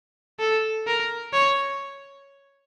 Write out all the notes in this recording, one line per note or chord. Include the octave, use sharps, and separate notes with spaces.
A4
A#4
C#5